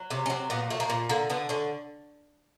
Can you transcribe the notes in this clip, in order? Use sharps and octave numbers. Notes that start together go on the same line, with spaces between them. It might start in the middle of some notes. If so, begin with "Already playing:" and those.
Already playing: F#3
C3 C#4
C#4
F#3 C4
A#2 B3
A3
A#3
A#2
D3 A#3
D3 B3
D3 C#4